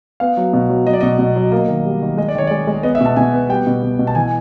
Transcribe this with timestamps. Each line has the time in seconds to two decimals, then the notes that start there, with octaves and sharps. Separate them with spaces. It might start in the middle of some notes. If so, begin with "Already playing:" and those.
0.20 B3 F5
0.37 F#3
0.53 B2
0.69 F#3
0.86 F#3 D#5
0.93 D5
1.01 B2 D#5
1.19 B2
1.36 F#3
1.52 A#3 D#5
1.68 D#3
1.85 G3
2.02 D#3
2.17 G#3 D#5
2.28 D5
2.35 D#3 C#5
2.47 G#3 D5
2.67 G#3
2.83 B3 D#5
2.95 E5
3.01 B2 A5
3.16 B2 G#5
3.34 B3
3.49 G3 G5
3.67 B2
3.83 B2
3.99 B2
4.07 A5
4.15 E3 G#5